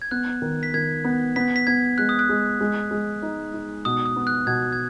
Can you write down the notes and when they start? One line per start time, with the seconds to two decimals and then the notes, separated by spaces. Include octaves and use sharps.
0.02 G#6
0.11 B3 F#6
0.42 D#3
0.63 B6
0.74 D#3 G#6
1.04 B3
1.36 B3 B6
1.56 B6
1.67 B3 G#6
1.98 G#3 F#6
2.09 D#6
2.19 F#6
2.29 G#3
2.61 G#3
2.91 G#3
3.22 D#4
3.54 D#4
3.85 B2 D#6
4.05 D#6
4.16 B3
4.27 F#6
4.47 B2 G#6
4.73 G#6